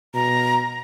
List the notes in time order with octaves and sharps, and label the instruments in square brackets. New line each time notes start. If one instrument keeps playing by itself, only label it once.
[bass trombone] B2 [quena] A#5